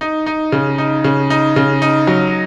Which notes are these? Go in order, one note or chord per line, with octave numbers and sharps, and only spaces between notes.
D#4
D#4
C#3
D#4
C#3
D#4
C#3
D#4
F#3